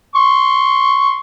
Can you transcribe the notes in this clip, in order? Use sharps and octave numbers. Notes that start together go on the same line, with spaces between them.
C6 C#6